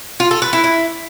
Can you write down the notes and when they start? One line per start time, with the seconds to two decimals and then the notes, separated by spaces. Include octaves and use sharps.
0.20 F4
0.31 A4
0.42 B4
0.53 E4
0.64 E4